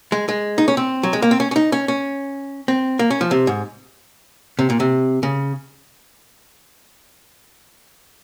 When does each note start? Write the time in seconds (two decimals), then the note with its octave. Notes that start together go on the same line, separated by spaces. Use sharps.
0.12 G#3
0.29 G#3
0.58 D#4
0.68 C#4
0.77 C4
1.03 F#3
1.13 G#3
1.22 A#3
1.31 C4
1.40 C#4
1.51 C#4
1.56 D#4
1.72 C#4
1.88 C#4
2.68 C4
2.99 A#3
3.10 C#4
3.21 F3
3.31 C3
3.47 G#2
4.59 C3
4.70 A#2
4.80 C3
5.23 C#3